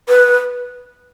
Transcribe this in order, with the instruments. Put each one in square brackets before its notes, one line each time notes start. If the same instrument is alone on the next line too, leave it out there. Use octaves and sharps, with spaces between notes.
[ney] B4